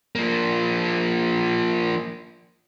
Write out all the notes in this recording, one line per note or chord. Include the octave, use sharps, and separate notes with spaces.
F3 A#3